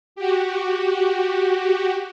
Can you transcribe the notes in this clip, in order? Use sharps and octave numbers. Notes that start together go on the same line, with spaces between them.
F#4 G4